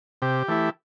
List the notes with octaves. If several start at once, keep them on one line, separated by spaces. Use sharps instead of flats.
C3 G4
E3 A3 E4